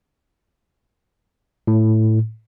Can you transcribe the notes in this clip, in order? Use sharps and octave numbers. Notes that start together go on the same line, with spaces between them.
A2